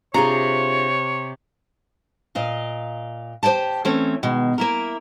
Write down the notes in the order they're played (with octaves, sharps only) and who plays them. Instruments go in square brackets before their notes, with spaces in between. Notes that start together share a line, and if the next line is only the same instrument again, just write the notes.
[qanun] C3 [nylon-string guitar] D4 F4 G#4 [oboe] C#5 [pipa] A#5
[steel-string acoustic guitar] A#2 D#5 F5
G4 C5 D5 G5 A5
E3 A3 C4 C#4
B2 D#3 G#3
A#3 E4 A#4